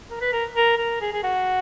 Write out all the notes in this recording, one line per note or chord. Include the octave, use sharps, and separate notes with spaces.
A#4
B4
A#4
A#4
A#4
G#4
G#4
F#4